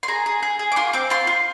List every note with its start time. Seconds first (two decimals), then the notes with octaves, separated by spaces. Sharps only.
0.03 C6
0.08 G#4 A#5
0.26 G#4
0.43 G#4
0.59 G#4
0.72 D6
0.76 F4 C6
0.93 C4 D6
1.10 F4 C6
1.27 F4